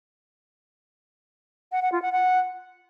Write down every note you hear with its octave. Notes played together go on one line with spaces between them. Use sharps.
F#5
F#5
F4
F#5
F#5